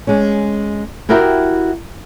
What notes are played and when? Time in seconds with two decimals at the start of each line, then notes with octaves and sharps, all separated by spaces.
0.07 G#3 C#4
1.09 E4 F#4 G4 A#4 E5 G5